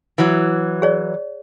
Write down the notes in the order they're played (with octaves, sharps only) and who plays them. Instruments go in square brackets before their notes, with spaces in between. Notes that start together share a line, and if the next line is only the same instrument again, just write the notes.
[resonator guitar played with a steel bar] E3 F#3
[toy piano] G#4 C#5 D5